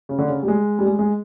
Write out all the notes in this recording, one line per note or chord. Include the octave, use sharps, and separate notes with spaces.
C#3
D3
C#3
G3
G#3
G3
G#3
G#3